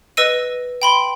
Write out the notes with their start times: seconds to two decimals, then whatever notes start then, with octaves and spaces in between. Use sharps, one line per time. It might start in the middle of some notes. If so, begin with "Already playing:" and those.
0.17 B4 D#5 E6 D#7
0.82 G5 B5 C6